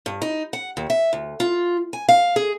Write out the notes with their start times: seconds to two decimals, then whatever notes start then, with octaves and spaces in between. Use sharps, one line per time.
0.06 G2
0.22 D#4
0.53 F#5
0.77 D#2
0.90 E5
1.13 D2
1.40 F4
1.93 G#5
2.09 F5
2.36 G#4